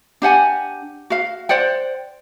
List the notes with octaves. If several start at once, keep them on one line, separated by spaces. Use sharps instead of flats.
D4 G4 F#5 G#5
F#4 F5
C5 D5 F#5 G5